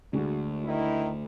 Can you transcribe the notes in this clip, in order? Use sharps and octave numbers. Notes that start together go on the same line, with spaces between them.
D2 D3 G#3 F#4
D#3 E4